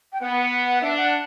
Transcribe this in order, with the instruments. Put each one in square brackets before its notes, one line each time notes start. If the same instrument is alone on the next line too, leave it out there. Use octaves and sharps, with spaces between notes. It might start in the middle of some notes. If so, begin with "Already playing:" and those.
[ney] G5
[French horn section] B3 [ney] F#5
[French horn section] D4 [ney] E5
[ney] F#5